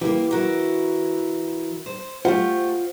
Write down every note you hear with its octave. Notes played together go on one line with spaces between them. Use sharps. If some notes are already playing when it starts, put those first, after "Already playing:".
E3 A#3 G4
E4 F#4 A#4
C5
A3 F4 G4 C5 F#5